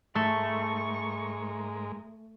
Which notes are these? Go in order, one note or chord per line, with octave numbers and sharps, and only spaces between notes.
G#2 G#3 A3 A#4 C#6